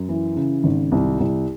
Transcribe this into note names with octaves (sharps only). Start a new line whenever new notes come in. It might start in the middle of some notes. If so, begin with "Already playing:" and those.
Already playing: F#2
E3
C#3
G#1
C2
C2